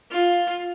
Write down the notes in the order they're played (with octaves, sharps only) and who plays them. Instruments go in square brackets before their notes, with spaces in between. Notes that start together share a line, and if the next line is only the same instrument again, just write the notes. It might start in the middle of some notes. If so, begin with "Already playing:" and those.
[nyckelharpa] F4